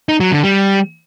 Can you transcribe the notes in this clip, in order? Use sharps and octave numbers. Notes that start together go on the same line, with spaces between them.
D#4
F#3
D3
G3